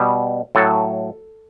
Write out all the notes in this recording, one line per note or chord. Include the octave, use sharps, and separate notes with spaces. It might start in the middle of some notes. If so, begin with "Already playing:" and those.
Already playing: B2 G3
A2 F#3 A4